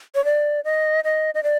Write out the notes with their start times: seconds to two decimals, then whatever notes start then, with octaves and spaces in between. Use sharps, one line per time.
0.15 C#5
0.25 D5
0.65 D#5
1.04 D#5
1.35 D#5
1.43 D5